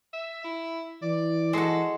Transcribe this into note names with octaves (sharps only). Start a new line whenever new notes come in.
E5
E4
E3 D5
G#3 F#4 A4